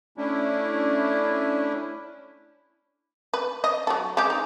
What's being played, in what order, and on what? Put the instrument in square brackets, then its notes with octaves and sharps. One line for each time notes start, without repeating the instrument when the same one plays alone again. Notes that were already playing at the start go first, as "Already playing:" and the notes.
[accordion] A3 C#4 D4 E4
[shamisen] B4
D#5
F#3 A4
G#3 G4
D#4